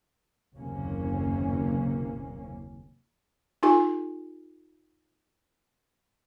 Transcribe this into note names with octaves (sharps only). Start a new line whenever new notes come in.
F#1 D#2 C3 A#3 C#4
D#4 F4 G4 A4 G#5 C#6